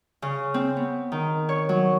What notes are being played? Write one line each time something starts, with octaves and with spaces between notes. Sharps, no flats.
C#3
C4
B3
D#3
C#5
F#3